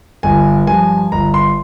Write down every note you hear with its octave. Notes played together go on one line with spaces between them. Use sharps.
G1 G#5
G2 F3 G#5
G1 A#5
C6